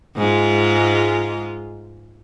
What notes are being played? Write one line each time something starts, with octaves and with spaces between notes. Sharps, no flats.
G#2 G#3 F4